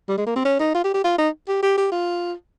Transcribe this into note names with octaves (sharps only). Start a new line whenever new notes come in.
G3
G#3
A#3
C4
C#4
D#4
F4
G4
G4
F4
D#4
G4
G4
G4
F4